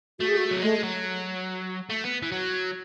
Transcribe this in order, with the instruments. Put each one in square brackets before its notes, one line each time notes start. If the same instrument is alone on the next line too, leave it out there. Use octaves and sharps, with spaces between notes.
[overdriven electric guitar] A3 [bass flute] F#4
[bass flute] G#4
F#4
[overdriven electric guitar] F#3
[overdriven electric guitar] G#3 [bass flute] A3
[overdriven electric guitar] F#3
A3
B3
E3
F#3